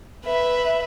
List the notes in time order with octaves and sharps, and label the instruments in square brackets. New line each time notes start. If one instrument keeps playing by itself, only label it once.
[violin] B4 E5